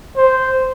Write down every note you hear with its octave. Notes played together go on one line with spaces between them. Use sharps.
C5